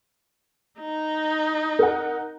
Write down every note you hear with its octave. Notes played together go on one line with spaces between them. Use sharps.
D#4
A#4 F#5